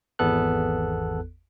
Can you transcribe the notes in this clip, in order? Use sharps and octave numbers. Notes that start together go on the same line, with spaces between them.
G#1 E2 B3 A4 F#6